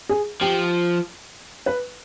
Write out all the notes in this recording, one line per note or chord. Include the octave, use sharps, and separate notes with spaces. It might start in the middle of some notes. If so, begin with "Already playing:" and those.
G#4
F3 G4
B4